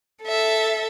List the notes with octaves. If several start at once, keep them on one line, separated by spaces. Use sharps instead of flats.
A4 E5